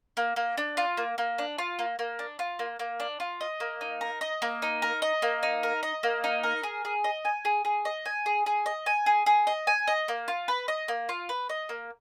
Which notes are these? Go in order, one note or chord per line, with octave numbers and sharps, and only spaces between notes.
A#3
A#3
D4
F4
A#3
A#3
D4
F4
A#3
A#3
D4
F4
A#3
A#3
D4
F4
D#5
A#3
D#4
A#4
D#5
A#3
D#4
A#4
D#5
A#3
D#4
A#4
D#5
A#3
D#4
A#4
G#4
G#4
D#5
G#5
G#4
G#4
D#5
G#5
G#4
G#4
D#5
G#5
G#4
G#4
D#5
G#5
D#5
A#3
F4
B4
D#5
A#3
F4
B4
D#5
A#3